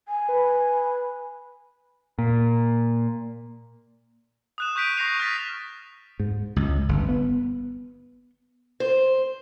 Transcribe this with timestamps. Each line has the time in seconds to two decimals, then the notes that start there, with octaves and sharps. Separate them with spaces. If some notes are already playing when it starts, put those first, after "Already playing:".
0.08 G#5
0.28 B4
2.18 A#2
4.58 D#6 F#6 E7
4.76 C#6 G6 B6 D7 D#7
4.97 C#6 A#6 C7 F7
5.20 F6 A6 B6
6.20 G#2
6.56 C#2
6.89 G1
7.09 B3
8.80 C5